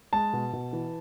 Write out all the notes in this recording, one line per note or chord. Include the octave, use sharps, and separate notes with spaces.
G#3 A5
B2
B2
E3